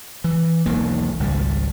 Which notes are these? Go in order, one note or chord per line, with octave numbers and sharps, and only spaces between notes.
E3
E1 B1 D#3 A#3
G#1 C#2 G3